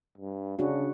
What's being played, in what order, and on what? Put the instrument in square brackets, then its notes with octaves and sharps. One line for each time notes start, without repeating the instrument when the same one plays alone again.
[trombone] G2
[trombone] C#3 [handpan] D4 F#4